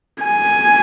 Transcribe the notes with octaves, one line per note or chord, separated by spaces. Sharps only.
G#5